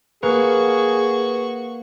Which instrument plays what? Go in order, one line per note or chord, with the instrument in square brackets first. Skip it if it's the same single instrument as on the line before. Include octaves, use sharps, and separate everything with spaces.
[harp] A#3 [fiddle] F#4 C#6 [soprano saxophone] G#4 [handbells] B4